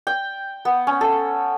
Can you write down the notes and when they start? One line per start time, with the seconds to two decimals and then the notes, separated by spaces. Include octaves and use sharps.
0.07 G5
0.65 B3
0.87 C#4
1.01 A4